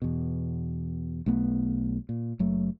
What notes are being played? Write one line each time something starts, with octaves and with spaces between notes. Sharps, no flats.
E2 B2
B1 A3 B3
A#2
F#1 F#3 A3